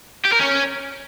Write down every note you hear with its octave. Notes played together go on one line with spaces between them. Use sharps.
G4
A#4
C#4